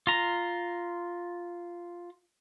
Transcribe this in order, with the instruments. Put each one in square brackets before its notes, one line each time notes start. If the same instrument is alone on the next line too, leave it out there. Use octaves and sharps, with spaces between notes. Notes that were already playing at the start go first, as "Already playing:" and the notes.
[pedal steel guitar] F4 A#5